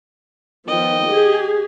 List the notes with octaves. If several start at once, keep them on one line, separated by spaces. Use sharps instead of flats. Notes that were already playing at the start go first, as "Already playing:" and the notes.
D#3 F3 B3 D#5 G5
G4 G#4